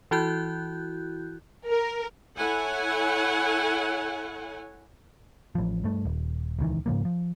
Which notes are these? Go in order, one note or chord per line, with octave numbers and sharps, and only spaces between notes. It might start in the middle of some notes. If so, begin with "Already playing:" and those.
E3 E4 F#4 F#6 G6
A#4
E4 A4 C#5 F#5 G#5
A1 F3
G2 A3
D#1
D#1 C#2 D#3 E3
G#2 C#3 F3 A#3
F3